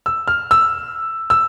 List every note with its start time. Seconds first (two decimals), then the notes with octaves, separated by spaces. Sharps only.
0.06 E6
0.28 F6
0.51 E6
1.30 E6